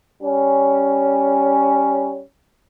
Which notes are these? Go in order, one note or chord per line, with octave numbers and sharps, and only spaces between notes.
G3 C#4